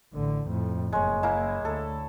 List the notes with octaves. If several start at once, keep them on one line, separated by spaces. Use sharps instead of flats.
A1 D3
F2 A2
F#1 G#3 C#5
G#3 A#3 E4
D2 A4